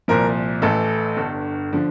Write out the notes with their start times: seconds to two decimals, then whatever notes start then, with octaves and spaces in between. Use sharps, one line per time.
0.08 C2 A#2 F3 A#4
0.62 A1 A2 E3 A4
1.16 G1 G2 D3
1.73 D3 F3